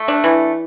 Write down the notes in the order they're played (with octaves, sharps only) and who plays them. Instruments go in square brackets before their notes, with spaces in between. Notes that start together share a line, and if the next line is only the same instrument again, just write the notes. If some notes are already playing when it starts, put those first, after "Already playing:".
Already playing: [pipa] A3
D4
E3